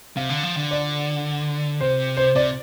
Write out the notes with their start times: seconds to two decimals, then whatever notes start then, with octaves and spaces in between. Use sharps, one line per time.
0.17 C3 F5
0.29 D3
0.43 F3
0.57 D3
0.71 D5
1.80 C3 C5
2.17 C5
2.35 C3 D5